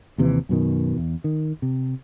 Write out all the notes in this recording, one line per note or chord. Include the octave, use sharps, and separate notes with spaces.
D#2 C3 D#3 E3
F#2 B2 D#3
E2
D#3
C3